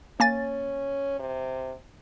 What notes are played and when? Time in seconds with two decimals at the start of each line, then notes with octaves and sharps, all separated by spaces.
0.20 A#3 C#4 G#5 A6
1.19 C3